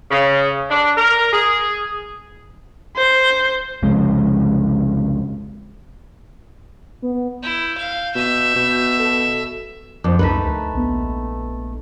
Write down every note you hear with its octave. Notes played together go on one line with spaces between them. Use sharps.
C#3
D4
A#4
G#4
C5
C2 F2 C#3 G#3
B3
E4 G6
F5
B2 E5
B2
A4
F2 C5 D6
C2 A3 D#4 B4 B6
D2
A#1 B3